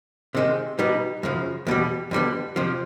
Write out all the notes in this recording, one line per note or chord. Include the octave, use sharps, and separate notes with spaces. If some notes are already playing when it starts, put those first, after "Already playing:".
C3 D#3 G#3 C4
B2 G3 B3 D#4
F#2 C#3 F3
E2 B2 G3
F2 D3 G3 B3
F2 C3 F3